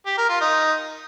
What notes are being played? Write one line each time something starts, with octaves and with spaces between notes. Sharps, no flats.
G4
A#4
F4
D#4